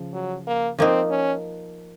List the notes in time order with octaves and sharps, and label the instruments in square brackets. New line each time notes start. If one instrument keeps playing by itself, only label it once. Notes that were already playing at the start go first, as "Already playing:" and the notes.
Already playing: [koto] C#3 F3
[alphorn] F#3
A#3
[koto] F3 A#3 D#4 [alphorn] C4
[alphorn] C#4